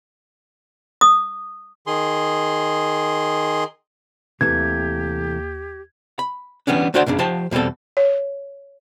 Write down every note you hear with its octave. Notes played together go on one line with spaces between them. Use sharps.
D#6
D#3 G#4 C6
D#2 C3 E3 A3 G4 G#6
B5
E3 G3 B3 C#4 D4
A3 D4 F#4 C5 D5 F#5
B1 F#2 C#3 D4
F3 G4 C5 A5
E2 B2 G3 C4 A4
C#5